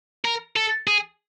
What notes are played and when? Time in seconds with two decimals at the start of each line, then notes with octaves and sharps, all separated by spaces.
0.25 A#4
0.56 A4
0.87 G#4